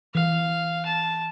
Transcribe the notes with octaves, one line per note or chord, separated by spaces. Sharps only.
E3 F5
A5